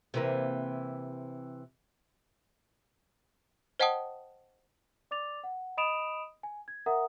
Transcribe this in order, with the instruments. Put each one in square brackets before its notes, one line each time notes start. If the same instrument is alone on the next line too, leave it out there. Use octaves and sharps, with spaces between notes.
[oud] C3 E3 A#3
[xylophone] C5 D#5 F#5 G5 A5 D#6
[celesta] D5 D6 A6 F7
F#5
D#5 B5 D#6 D7 E7 F7
G#5
G#6
A#4 E5 F#5 A#5 D#6